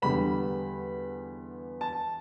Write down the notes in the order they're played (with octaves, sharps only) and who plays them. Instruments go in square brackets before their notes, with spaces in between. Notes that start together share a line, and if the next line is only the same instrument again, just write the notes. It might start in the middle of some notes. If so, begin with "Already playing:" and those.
[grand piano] E2 D3 G3 B3 [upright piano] B5
[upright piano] A5